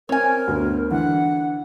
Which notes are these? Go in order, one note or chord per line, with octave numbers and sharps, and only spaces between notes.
C4 A#4 C#5 G#5
D2 B3
D3 E3 F#5